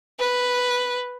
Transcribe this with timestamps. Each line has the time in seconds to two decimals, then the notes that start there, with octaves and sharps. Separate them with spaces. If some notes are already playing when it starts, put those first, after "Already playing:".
0.20 B4